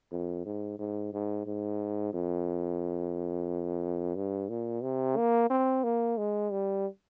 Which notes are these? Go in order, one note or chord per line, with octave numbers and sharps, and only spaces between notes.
F2
G#2
G#2
G#2
G#2
F2
G2
A#2
C3
A#3
C4
A#3
G#3
G3